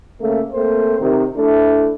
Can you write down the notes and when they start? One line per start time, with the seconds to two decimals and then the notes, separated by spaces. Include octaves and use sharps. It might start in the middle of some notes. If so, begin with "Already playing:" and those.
0.20 C#3 A3 A#3
0.53 A3 A#3 C4 C5
1.00 C3 D#3
1.36 A3 D4 E4